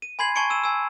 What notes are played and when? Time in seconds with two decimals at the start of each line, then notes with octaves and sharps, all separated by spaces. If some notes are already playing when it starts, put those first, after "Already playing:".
0.02 D#7
0.19 G#5 B5 C6 G#6 C7 F#7
0.36 G#5 A5 C#6 G#6 C#7 D7
0.50 E6 D#7 E7
0.64 G#5 E6